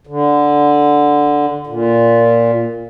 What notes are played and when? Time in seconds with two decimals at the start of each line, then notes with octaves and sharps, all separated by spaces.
0.07 D3
1.67 A#2